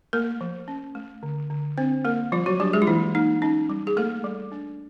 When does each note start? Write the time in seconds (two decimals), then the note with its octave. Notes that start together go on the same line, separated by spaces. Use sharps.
0.13 A3 A#3 A#4
0.41 F3
0.68 C#4
0.95 A3
1.23 D3
1.50 D3
1.78 C4 D4 C5
2.05 A#3 A#4
2.32 F3 G3 F4
2.46 F#3 F#4
2.60 G3 D4 G4
2.73 G#3 G#4
2.82 F4
2.87 E3 A#3 E4
3.15 A#3 D#4
3.42 C#4 D#4
3.69 G3
3.87 G#4
3.97 A3 A#3 A4
4.24 G3
4.52 D4